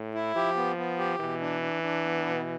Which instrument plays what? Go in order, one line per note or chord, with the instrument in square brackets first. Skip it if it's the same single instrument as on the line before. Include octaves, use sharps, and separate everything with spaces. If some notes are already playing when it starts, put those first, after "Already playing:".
Already playing: [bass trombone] A2
[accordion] E4
[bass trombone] F3 [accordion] G4
[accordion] B3
B3
G4
[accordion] B2 [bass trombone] E3
[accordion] D4
D4
D4
B3
B2